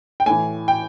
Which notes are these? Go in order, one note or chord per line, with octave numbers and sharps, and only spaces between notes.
G5
A2 E3 G#5
G5